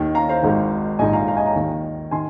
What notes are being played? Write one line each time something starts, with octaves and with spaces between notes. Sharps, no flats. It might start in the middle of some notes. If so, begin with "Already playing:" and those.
Already playing: D#2 D#3
F5 A#5
C5 F5
G#1 G#2 D#3
A#1 G#2 D#3 D#5 G#5
F5 A#5
F5 A#5
D#5 G#5
F5 A#5
D#2 D#3
D#3 G#5 C6